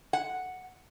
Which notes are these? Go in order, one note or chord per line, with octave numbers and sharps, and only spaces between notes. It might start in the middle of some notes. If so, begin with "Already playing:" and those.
F#5